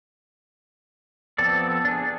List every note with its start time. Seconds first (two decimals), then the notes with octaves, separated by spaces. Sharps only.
1.38 F3 B3 C4 A4 D5
1.85 D4 G#4